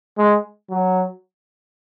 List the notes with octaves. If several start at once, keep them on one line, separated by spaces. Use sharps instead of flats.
G#3
F#3